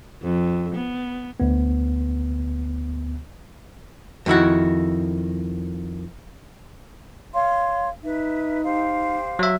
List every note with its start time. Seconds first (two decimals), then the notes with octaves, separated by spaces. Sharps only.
0.22 F2
0.75 B3
1.40 D2 B3
4.26 F2 D#3 E4 F#4
7.34 C#5 F5 C6
8.03 D#4 B4 E5
8.64 G4 C5 F5
9.39 F#3 E5